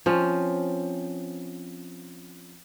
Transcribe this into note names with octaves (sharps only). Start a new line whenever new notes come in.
F3 C4 C#4